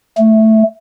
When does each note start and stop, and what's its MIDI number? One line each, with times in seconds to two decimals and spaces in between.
0.18 0.63 57